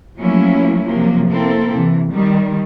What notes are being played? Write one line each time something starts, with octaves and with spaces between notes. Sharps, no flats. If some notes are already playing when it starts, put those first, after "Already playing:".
F3 F#3 A3 A#3 C#4 E4
C3 F3 F#3 A#3
A#3 C4 E4 A4
C3 E3
D#3 G3